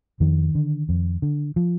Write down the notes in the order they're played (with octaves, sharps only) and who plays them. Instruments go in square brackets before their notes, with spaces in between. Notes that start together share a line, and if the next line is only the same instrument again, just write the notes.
[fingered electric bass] F2 D#3
D3
F2
D3
F3